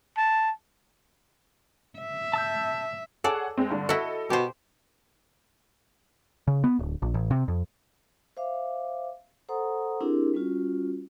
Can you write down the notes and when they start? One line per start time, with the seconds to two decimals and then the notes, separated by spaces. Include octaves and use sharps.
0.18 A5
1.99 E5
2.34 A5 E6 G6
3.24 G#4 A4 C#5 D5 F#5
3.57 G#3 C4
3.71 G2 D3
3.89 E4 F#4 A4 D#5
4.30 B2 G4 C5
6.48 C#3
6.64 B3
6.79 D1
7.02 A#1
7.14 A1
7.31 C3
7.48 F2
8.37 C5 E5 F5 D6
9.49 A4 C5 F#5 A#5 C6 D#6
10.01 C4 D4 E4 G4 G#4 A#4
10.34 G3 C#4 F4 F#4